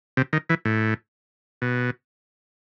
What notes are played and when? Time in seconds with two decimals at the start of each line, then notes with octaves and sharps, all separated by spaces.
0.17 C3
0.33 D#3
0.50 E3
0.65 A2
1.62 B2